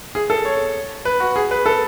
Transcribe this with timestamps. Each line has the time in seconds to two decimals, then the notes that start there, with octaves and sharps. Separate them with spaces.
0.15 G#4
0.30 A4
0.45 C#5
1.05 B4
1.20 F#4
1.36 G#4
1.51 B4
1.66 A4